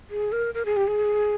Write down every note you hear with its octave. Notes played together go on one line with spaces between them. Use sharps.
G#4
A#4
A#4
G#4
G4
G#4